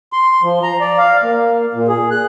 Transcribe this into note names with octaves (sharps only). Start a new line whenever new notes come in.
C6
F3
A#5
D5
F5
A#3
A#2
G#4
F#6